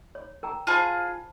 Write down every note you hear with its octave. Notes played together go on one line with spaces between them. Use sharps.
C#5
A#4 G5 A#5
F4 G#4 C5 A5 B5